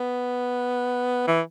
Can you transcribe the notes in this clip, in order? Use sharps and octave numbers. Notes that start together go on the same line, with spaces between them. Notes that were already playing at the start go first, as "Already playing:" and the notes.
Already playing: B3
E3